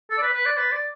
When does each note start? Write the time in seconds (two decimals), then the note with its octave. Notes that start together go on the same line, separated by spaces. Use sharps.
0.10 A4 E6
0.17 D5
0.22 B4
0.33 B4 F#6
0.46 D5
0.57 B4 A6
0.72 D5